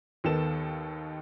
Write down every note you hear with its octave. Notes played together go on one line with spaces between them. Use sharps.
D#2 D#3 B3 A4 E7